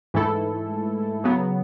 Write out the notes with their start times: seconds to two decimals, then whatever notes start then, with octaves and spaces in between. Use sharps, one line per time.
0.14 G#2 E3 A3 E4 A4
1.24 C#3 F#3 B3